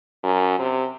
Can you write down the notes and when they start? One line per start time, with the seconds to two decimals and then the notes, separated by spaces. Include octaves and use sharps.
0.24 F#2
0.59 C3